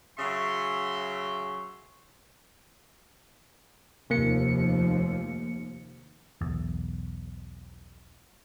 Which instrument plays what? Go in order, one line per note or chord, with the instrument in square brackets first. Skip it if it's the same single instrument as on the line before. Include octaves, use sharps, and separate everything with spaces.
[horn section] C#3 F#3 C#5 E5 C6
[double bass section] F1 D#2 F3 [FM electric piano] C3 A#3 C#7
[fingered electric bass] B1 E2